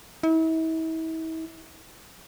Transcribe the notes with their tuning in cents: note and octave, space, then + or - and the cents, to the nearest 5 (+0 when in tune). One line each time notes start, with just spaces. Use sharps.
E4 -40